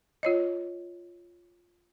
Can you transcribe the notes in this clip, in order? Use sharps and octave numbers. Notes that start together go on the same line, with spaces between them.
F4 C#5 D#5